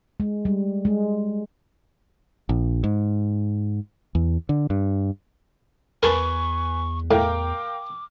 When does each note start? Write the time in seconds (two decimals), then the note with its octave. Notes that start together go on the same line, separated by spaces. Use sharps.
0.20 G#3
0.45 G3
0.85 G#3
2.49 A#1
2.84 G#2
4.15 E2
4.49 D3
4.70 G2
6.03 E2 A#4 B4 G#5 A5 C#6
7.11 A2 A#4 F5 G5 D6